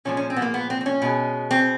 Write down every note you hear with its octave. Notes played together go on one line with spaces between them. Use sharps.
A#2 F3 G#3 C#4
C#4
C4
B3
A#3
B3
C4
C4
C#4
B2 G#3
C4